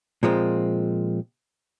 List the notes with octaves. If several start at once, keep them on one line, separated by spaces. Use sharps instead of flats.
A#2 F3 G#3 C4